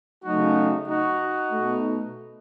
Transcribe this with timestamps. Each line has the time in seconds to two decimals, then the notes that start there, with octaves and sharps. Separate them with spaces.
0.24 C#3 F#3 A3 D#4 F#4
0.88 D#4 F#4
1.51 B2 A3